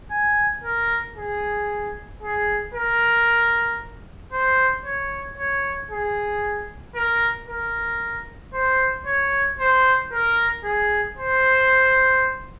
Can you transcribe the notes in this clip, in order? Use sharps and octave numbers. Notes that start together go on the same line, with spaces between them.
G#5
A#4
G#4
G#4
A#4
C5
C#5
C#5
G#4
A#4
A#4
C5
C#5
C5
A#4
G#4
C5